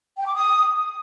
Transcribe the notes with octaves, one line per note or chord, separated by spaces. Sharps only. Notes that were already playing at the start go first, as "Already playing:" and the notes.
G5
D6
D#6